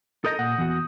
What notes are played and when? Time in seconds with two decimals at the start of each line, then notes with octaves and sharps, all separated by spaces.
0.25 A4 A#4 D#5 D#6 G6 A#6
0.39 A#2 F#5
0.59 E2 F#4